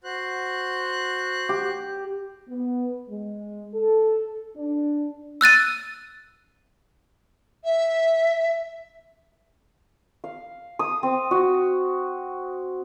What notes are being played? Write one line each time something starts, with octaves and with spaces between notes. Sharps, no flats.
F#4 C5 F#6
G4
B3
G#3
A4
D4
E6 F#6 A6 D#7
E5
F5
D#6
C4
F#4